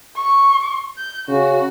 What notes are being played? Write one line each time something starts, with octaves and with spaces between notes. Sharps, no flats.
C#6
G6
C#3 F#4